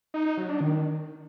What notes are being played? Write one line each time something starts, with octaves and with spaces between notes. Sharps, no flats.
D#4
D#4
F#3
D4
D#3